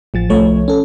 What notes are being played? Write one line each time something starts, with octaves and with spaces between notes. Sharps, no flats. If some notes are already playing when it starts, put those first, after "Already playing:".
A1 F3 A6
C2 F3 A3 C#5
C#4 A4